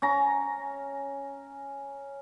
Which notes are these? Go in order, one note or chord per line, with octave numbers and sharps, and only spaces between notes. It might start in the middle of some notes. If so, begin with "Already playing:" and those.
C#4 A#5